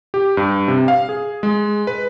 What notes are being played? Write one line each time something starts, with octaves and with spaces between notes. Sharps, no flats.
G4
G2
C3
F5
G#4
G#3
B4